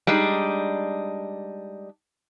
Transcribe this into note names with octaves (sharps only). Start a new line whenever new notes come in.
G3 G#3 D4 D#4